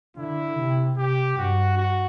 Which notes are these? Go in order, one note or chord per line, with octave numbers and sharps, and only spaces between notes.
D3 E4
C3
C3 G4
G2 F#4
F#4